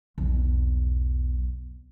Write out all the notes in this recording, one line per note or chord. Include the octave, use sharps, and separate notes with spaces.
B1 E2